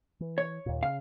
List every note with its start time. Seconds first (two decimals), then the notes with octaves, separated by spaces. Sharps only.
0.20 E3
0.38 C#5
0.66 D#2 A#2
0.83 C#3 F5